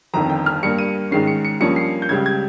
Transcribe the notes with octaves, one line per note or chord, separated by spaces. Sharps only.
G1 F2 D#3 A#5
G5
F6
G2 G3 A#3 C#7
D#7
G#2 D#3 G#3 C#4 C7
C#7
C#7
G2 F3 A#3 C#4 C#7
C7
G6
C#2 C#3 G3 G#6
G#6